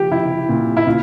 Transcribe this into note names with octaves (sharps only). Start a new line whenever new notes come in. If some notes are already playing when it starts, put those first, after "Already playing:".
Already playing: F3 G4
F3 E4
A#2
E4
A#2 F4